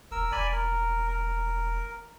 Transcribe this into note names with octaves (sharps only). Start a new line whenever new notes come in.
E1 A#4 E6
E1 D5 G#5 B5
A#4
A#4